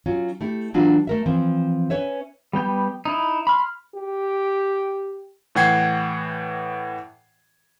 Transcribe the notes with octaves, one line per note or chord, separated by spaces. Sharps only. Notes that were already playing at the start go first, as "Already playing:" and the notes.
F#3 C#4 F4
A3 E4 G4
E3 F#3 D4 F4
A3 A#4 E5
E3 F3 C4
C#4 B4 C#5 E5
G3 B3 G5 G6
D#4 E4
B5 C6 F6
G4
A2 E3 F#5 G5 G#6 C7